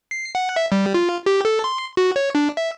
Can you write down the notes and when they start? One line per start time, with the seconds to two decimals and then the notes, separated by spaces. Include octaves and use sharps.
0.11 C7
0.35 F#5
0.56 E5
0.72 G3
0.94 F4
1.26 G4
1.45 A4
1.64 C6
1.97 F#4
2.16 C#5
2.35 D4
2.57 E5